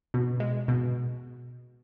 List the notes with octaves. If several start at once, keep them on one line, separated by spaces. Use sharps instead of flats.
B2
G#3
B2